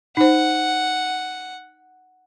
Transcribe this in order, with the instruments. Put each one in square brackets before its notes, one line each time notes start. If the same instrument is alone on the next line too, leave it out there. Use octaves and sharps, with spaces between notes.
[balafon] D#4 C5 [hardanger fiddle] F#5